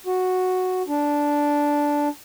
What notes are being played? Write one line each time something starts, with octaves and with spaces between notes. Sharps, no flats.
F#4
D4